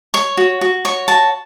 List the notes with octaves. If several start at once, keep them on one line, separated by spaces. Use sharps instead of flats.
C#5 C#6
F#4
F#4
C#5 C#6
F#4 A5